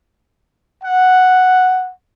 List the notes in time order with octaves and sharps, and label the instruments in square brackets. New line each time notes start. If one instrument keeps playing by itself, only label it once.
[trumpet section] F#5